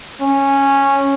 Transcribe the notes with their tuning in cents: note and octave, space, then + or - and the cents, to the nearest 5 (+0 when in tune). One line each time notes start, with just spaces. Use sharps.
C#4 -10